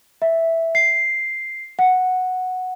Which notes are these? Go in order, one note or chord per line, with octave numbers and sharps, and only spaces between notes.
E5
C7
F#5